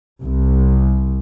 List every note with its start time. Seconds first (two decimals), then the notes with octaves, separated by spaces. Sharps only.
0.22 C2